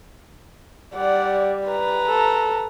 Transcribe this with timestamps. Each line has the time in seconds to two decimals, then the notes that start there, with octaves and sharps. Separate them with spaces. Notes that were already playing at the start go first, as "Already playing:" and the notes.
0.95 G3 D5 F#5
1.68 B4 A#5
2.08 A4